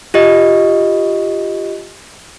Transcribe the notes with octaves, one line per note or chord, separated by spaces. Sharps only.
F4 G4 D#5